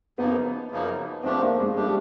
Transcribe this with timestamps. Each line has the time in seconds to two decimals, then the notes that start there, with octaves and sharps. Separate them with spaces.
0.18 F#2 C#3 F3 A#3 B3 D#4
0.71 F#2 C#3 F3 A#3 D#4
1.23 G#2 F3 A3 C4 D4 G4
1.41 A#3
1.59 G#3
1.76 F3 G3 A3 D4 G4